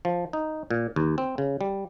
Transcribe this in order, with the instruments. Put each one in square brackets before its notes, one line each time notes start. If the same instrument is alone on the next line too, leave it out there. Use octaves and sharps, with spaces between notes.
[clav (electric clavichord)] F3
D#4
A#2
D#2
C4
C#3
G3